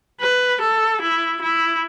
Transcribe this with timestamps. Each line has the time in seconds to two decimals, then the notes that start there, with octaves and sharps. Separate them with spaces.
0.21 B4
0.61 A4
1.02 E4
1.42 E4